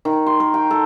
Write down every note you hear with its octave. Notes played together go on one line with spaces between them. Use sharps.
D#3
C6
A#4
G5
A4